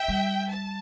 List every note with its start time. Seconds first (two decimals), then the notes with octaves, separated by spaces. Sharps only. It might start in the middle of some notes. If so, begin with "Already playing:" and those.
Already playing: E5 G5
0.08 G3
0.51 A5